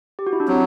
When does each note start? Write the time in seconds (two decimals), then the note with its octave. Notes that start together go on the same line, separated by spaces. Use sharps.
0.19 G4
0.27 F#4
0.33 E4
0.40 D4
0.48 F#3 C4